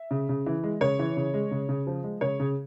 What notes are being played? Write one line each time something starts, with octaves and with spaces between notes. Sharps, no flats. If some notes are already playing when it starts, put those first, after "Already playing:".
Already playing: E5
C#3
C#3
E3
G#3
C#3 C#5
E3
C#3
G#3
C#3
C#3
F3
G#3
C#3 C#5
C#3